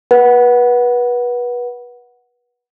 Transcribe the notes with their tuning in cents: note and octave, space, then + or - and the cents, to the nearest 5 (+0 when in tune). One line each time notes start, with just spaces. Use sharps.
B4 -25 F#5 +0